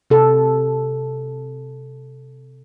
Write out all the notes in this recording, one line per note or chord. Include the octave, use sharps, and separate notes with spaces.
C3 A4